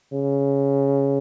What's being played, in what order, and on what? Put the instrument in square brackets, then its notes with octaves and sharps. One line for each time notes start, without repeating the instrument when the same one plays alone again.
[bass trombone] C#3